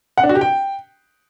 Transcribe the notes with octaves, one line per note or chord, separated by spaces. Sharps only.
F#5
D4
F#4
G4
G5